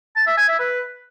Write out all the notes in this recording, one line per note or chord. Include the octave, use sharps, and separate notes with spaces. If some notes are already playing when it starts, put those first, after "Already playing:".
A5
E5
G#5
E5
B4